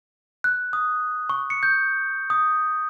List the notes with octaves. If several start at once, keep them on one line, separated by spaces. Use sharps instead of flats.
F#6
D#6
C#6
C#7
G6
D#6